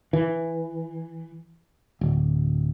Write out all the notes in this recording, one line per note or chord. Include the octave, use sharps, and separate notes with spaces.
E3
D1